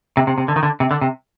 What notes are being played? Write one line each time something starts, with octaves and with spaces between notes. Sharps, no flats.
C3
C3
C3
D3
D#3
D3
C3
D3
C3